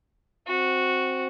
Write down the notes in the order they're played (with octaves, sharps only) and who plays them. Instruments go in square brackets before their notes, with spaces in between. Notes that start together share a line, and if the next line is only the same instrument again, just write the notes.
[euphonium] C4 [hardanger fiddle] F#4